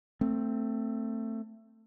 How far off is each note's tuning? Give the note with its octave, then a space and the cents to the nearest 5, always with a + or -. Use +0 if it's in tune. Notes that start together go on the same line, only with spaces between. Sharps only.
A3 +15 C4 +0